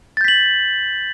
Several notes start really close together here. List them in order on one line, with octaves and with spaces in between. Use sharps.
A6 G6 B6 F#7